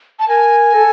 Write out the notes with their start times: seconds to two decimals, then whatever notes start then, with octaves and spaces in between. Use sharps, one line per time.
0.19 A5
0.28 A#4 G#5
0.74 A4